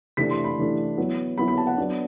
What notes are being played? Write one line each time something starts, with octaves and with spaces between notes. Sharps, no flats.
C3 E3 A3 D4 B6
C6
B5
C3 E3 A3 D4
F#3 B3 E4
F#3 B3 E4 B5
B5
A5
F#5
F#3 B3 D4